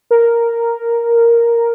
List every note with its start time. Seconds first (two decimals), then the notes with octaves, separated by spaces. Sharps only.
0.11 A#4